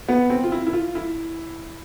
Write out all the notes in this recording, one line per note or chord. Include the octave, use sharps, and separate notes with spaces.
B3
C4
F4
E4
E4
F4
E4